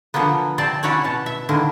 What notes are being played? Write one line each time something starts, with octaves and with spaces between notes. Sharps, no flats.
D3 F3 F#3 A#3 B3
C3 C4 D5 A5
C#4 E4 F#4 C#5 D5
B2 A5
E5
D3 D#3 A#3 E4